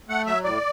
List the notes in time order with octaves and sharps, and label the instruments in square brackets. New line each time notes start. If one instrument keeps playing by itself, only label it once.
[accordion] A3 F#5
F#3 E5
A2 D5